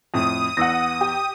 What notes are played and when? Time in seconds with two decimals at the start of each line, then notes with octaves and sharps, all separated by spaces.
0.14 F2 A2 D#6
0.57 E2 F#5 E6 A#6
1.01 G4